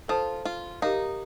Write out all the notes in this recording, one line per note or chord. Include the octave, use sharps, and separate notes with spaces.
F4 A4 C5 F5 A5 D#6
F4
D#4 G4 A#4 F5